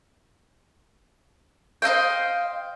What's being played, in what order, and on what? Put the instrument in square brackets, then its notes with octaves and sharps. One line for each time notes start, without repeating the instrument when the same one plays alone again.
[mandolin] C5 D#5 F5 G5